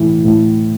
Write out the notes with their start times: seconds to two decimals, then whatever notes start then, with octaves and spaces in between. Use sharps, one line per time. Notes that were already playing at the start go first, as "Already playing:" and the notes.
Already playing: A2 E3
0.24 A2